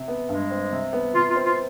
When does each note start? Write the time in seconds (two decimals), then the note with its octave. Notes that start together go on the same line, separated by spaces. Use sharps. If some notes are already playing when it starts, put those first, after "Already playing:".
Already playing: C3
0.08 B3
0.29 G2 G#3
0.51 C4
0.72 C3
0.93 B3
1.15 C3 F4
1.30 F4
1.36 C4
1.46 F4